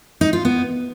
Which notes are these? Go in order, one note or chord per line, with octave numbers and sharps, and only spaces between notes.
D#4
F4
B3